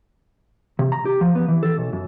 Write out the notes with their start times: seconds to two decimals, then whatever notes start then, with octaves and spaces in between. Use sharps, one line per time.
0.79 C3
0.92 A#5
1.05 G4
1.21 F3
1.35 B3
1.48 E3
1.63 A4
1.77 B1
1.93 F#2